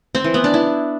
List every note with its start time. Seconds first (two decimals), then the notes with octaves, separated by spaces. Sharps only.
0.15 C4
0.24 E3
0.34 B3
0.44 D4
0.54 E4